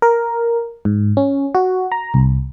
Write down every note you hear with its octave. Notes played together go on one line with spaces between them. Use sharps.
A#4
G#2
C#4
F#4
A#5
C2